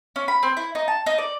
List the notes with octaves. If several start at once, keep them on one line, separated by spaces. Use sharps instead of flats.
C#4
B5
C4
E4
D#4
A5
D#4
D5